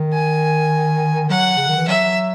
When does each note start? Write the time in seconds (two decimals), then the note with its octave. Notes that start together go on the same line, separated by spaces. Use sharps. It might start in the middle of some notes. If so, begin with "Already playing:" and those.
Already playing: D#3
0.13 G#5
1.29 F#3 F#5
1.57 C#3
1.68 D#3
1.78 E3
1.88 F#3 E5